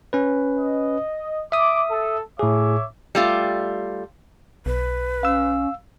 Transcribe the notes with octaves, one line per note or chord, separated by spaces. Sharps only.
C#4 B4
D#5
E5 D6 D#6
A4
A2 G#4 C#5 E5 D6
G3 A3 F4
B1 B4
C#4 F5 E6